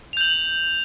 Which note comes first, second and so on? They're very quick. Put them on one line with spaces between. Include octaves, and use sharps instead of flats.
F7 G6 F#7